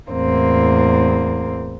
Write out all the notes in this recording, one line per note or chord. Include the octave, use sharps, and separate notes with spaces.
E2 A2 A#3 C4